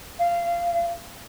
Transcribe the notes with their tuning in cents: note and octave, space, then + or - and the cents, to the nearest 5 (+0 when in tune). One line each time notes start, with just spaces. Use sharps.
F5 -20